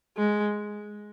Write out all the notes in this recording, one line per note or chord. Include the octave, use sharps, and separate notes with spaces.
G#3